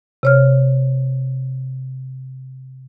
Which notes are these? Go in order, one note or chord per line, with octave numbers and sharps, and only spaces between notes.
C3 C#5 F6